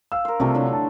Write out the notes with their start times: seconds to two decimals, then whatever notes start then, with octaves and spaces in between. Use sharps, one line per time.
0.12 F5 E6
0.25 A#4 C5
0.40 C3 F3 G3 A3
0.55 D3 F#3 E4
0.73 A5